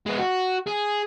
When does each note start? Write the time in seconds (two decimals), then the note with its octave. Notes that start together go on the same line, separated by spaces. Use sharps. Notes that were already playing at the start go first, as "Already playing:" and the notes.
0.06 G#3 B3
0.19 F#4
0.67 G#4